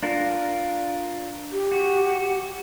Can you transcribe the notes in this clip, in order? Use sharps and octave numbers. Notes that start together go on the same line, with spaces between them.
D4 F4 A#4
G4
F#4